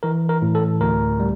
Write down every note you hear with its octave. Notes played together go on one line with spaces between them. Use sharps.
E3 A#4
A#4
A2
A4
D2 A#4
G3